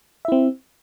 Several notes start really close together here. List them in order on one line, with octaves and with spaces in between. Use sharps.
E5 E4 C4